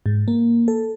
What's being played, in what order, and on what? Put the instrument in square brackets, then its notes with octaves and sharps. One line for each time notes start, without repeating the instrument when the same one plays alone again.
[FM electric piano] G#2
A#3
A4